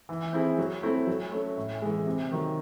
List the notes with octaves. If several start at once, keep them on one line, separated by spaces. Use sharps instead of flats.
E3
C4 E4 G#4
F#3
A3 C4 E4
F#3
A3 C#4
A2
E3 G#3
C3
D#3 F#3